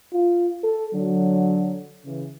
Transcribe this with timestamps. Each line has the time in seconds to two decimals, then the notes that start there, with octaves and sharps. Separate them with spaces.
0.13 F4
0.64 A4
0.94 D3 F#3
2.05 C#3 E3